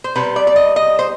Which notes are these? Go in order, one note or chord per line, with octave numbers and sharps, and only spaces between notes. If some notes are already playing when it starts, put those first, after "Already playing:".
C5
C3 G3 B4
D5
D5
D#5
D#5
C5